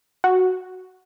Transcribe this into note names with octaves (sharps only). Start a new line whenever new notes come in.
F#4